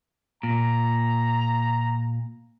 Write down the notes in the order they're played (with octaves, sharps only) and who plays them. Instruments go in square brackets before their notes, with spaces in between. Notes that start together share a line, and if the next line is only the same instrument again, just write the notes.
[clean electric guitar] A#2 [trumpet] A#5